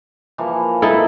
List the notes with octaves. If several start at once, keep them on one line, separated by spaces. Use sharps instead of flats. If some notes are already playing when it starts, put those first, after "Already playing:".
E3 F3 A#3
D#4 E4 A4